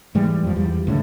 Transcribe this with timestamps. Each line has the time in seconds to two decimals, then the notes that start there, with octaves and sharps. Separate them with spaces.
0.15 G#2 E3 G3 G#3
0.44 F2 F3
0.56 E2 G3
0.87 C#2 A2 D3